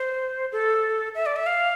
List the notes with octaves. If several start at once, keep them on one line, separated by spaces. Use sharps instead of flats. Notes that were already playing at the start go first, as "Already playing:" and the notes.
Already playing: C5
A4
E5
D5
E5
F5